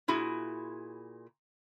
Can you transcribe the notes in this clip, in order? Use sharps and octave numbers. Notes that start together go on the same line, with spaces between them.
A#2 E4 F#4 G#4